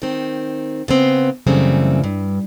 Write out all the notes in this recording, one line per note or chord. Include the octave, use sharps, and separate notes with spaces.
D#3 C4
C#3 B3 C4
F#2 C#3 E3 G3 A3 C4
G2